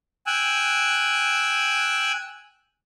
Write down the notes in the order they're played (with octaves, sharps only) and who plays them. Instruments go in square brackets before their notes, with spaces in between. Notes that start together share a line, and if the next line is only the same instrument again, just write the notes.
[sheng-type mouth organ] G5 G#5 E6 F#6